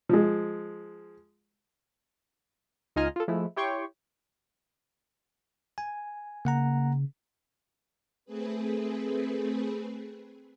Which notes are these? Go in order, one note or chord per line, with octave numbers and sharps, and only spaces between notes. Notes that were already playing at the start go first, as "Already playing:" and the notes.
F3 G#3
C#2 D#4 F4 D#5 G#5 F6
F4 A4
F3 G#3 A3 E4
E4 G4 C#5 G5 C6 C#6
G#5
C#3 A#3 F#5 A#5
A3 C4 G#4 B4